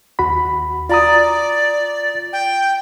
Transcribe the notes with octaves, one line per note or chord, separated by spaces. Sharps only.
D#2 F#4 B5
F4 D5 A#5 D#6
G5